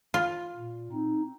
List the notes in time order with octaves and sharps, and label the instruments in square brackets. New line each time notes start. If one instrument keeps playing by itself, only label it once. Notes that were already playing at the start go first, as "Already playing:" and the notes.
[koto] F4
[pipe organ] A#2
C4 D#4